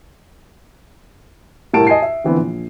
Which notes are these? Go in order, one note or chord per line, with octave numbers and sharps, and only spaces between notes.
C2 A2 A#4 A5 D7
D#5 G#5 A5 C7
E5
D3 E3 B3 C4
A#1